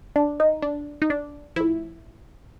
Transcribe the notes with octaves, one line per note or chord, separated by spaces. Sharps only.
D4
D#4
D4
D#4
D4
A2 F3 E4